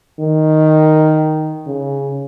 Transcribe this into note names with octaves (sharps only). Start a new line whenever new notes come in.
D#3
C#3